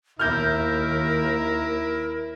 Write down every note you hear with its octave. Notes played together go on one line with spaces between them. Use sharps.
D#2 E4 A#4 F6 G6